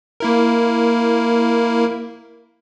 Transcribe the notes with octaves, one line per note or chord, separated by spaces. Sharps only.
A#3 E4 A#4